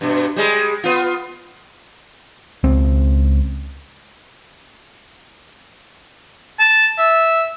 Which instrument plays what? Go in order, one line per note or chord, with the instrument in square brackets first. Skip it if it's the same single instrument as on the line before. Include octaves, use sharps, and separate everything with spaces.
[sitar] G2 B2
G3 G#3
B3 F4
[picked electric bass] C#2 C4
[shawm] A5
E5